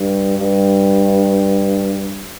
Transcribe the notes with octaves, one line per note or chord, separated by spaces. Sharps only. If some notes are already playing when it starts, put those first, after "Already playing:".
Already playing: G2
G2